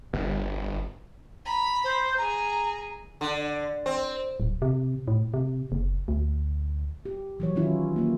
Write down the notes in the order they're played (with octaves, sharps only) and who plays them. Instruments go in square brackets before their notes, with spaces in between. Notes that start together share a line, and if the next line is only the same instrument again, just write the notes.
[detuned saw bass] G1
[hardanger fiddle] A#5 B5
[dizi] C5
[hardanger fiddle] G#4 [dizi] A#5
[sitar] D3
C4
[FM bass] D1
C3
A2
C3
F#1
D2
[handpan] G4
E3 F#3 C#5
D#3 F#3 C#4 E4 F4
A#3 F4